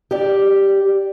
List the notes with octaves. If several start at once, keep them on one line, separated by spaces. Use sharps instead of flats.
G4 D5